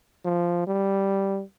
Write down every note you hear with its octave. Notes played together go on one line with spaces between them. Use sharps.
F3
G3